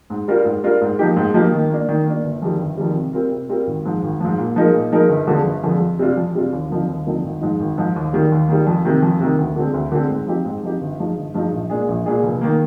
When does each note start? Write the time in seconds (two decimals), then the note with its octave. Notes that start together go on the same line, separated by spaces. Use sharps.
0.10 G#2
0.28 G3 D4 F4 A#4
0.45 G#2
0.63 G3 D4 F4 A#4
0.81 G#2
0.99 F3 A#3 D#4 G4
1.16 G#2
1.34 F3 A#3 D#4 G4
1.52 D#3
1.70 A#3 D4
1.89 D#3
2.06 A#3 D4
2.24 G1
2.42 F2 D#3 G3
2.60 G1
2.77 F2 D#3 G3
2.96 C3
3.13 G3 C4 F4 A#4
3.31 C3
3.49 G3 C4 F4 A#4
3.67 G#1
3.85 G#2 F3
4.02 G#1
4.20 G#2 F3
4.38 A#2
4.56 F3 G#3 D#4 A#4
4.74 A#2
4.92 F3 G#3 D#4 A#4
5.09 G1
5.27 F2 D3 F3 G#3
5.46 G1
5.63 F2 D3 F3 G#3
5.81 F2
5.99 C3 G3 D4 F4
6.17 F2
6.35 C3 G3 D4 F4
6.52 D#2
6.70 D3 F3 C4 D#4
6.88 D#2
7.07 D3 F3 C4 D#4
7.24 G#1
7.41 G#2 F3 G#3 D#4
7.59 G#1
7.78 G#2 F3 G#3 D#4
7.96 D#2
8.13 D#3 G3
8.32 D#2
8.49 D#3 G3
8.67 F2
8.85 C3 D#3
9.02 F2
9.20 C3 D#3
9.38 D2
9.56 D3 G#3 C4
9.74 D2
9.92 D3 G#3 C4
10.10 G#2
10.27 F3 C4 D#4 G4
10.45 G#2
10.63 F3 C4 D#4 G4
10.81 G1
10.99 G2 F3 G#3 D#4
11.17 G1
11.34 G2 F3 G#3 D#4
11.52 A#1
11.70 A#2 G#3 D4 G#4
11.88 A#1
12.06 A#2 G#3 D4 G#4
12.23 F1
12.41 D#3 A#3